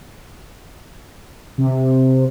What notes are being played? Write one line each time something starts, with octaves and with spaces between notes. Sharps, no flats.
C3